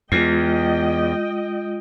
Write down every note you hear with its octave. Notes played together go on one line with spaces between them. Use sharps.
E2 G#3 F4 D#5 G5